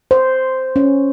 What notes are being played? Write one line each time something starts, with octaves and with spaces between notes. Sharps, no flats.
C5
C#4